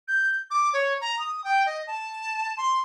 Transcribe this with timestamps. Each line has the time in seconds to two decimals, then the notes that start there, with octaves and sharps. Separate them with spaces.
0.08 G6
0.51 D6
0.74 C#5
1.01 A#5
1.19 D#6
1.44 G5
1.66 D#5
1.87 A5
2.57 C6